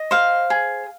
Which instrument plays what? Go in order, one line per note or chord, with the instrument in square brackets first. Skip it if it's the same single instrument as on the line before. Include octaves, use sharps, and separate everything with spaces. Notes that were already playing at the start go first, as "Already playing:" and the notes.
Already playing: [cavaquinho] D#5
C5 F5
G#4